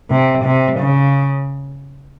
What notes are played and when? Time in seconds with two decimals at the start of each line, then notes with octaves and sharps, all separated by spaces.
0.10 C3
0.44 C3
0.79 C#3